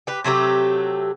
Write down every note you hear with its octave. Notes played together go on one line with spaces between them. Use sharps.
G4 B4
C3 F#3 A3 G4